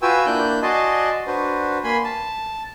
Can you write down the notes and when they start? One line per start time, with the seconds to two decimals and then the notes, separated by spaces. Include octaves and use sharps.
0.02 F4 F#4 B4 G5 G#5 E6
0.26 A#3 D4 E4 F#6 G6
0.62 F#4 D5 D#5 G#5 A5 C6
1.27 D4 F#4 B4 C5
1.84 A#3 G#5 B5 C6
2.04 A5